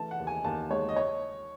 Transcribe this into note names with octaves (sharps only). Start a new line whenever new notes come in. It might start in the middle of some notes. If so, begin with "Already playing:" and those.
Already playing: E3 A3 A5
F#5
D#2
G#5
D#2 A5
G#3 C#5
D#5
C#5